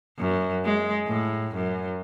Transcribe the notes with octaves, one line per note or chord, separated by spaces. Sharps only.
F#2
G#3
A2
F#2